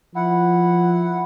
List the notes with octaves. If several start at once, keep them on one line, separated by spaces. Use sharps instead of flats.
F3 E4 F#5